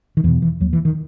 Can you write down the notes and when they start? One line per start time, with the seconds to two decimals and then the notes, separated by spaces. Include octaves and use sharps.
0.17 D#3
0.24 E2 E3
0.27 B2
0.42 E3
0.60 D#2 F#3
0.73 E3
0.85 D#3